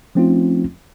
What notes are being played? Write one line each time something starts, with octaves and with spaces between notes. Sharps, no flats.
F3 A3 C4 C#4 D#4 F4